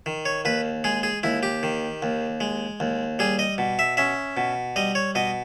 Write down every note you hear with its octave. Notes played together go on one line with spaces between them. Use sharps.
D#3
C#5
D#2 B4
G#3 G#4
G#4
D#2 E4
G4
D#3
D#2
G#3
D#2
G3 G#4
D#5
B2
E5
C#4 E5
B2
G3 D#5
C#5
B2 D#5